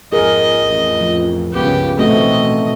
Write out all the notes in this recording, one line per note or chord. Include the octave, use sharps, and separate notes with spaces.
G#1 F2 G#4 A#4 D#5
A1 F2
F3
C#2 G2 C#3 B3 G4
A1 B2 D#3 A3 C4 F#4 D#5